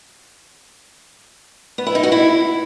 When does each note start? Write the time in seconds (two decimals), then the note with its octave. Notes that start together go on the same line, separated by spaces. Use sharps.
1.78 B3
1.87 E4
1.95 D#4
2.03 F#4
2.12 E4